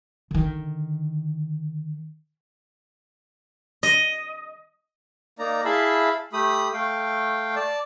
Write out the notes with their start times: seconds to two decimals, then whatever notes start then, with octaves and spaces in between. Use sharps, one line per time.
0.31 D3 D#3
3.83 D#5
5.39 A#3 D#4 D5 A#5
5.65 E4 G#4 E5 F5 A5 B5
6.33 A3 G4 B5 D#6
6.73 A3 F5 G5
7.56 D5 A5